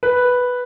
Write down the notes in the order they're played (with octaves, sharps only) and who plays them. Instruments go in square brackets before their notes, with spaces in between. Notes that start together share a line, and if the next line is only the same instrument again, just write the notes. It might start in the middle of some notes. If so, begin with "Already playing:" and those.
[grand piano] B4